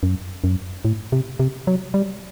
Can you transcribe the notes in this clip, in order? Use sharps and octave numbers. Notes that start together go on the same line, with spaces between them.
F#2
F#2
A2
C3
C3
F#3
G3